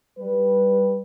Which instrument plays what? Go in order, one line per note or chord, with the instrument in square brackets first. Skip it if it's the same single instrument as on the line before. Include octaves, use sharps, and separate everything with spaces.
[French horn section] G3 B4